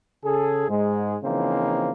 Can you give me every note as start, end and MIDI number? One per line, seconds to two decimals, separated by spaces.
0.24 0.66 49
0.24 0.66 68
0.24 0.66 69
0.68 1.16 44
0.68 1.16 56
1.23 1.91 49
1.23 1.91 52
1.23 1.91 53
1.23 1.91 58
1.23 1.91 60
1.23 1.91 63